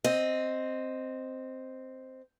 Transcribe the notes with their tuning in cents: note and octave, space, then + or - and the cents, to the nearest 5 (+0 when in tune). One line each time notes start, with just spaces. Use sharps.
C4 +0 D#5 +0